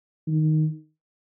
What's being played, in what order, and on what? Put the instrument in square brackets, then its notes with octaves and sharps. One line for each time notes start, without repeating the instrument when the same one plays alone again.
[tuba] D#3